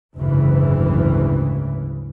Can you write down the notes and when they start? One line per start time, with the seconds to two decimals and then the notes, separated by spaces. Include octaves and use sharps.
0.15 F#1 D2 G#2 C#3 E3